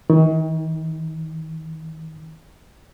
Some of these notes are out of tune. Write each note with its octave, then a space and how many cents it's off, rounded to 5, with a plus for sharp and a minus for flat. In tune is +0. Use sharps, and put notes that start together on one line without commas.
D#3 +40